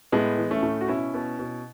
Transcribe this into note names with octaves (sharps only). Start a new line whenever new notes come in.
A2 G#3 B3
E3
A3 C#4
A2
F#4
B2 C#4 E4
B2
B2